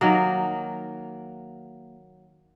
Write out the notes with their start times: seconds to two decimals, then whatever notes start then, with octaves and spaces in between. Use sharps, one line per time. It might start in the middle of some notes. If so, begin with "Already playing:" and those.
0.01 D#3 F#3 A#3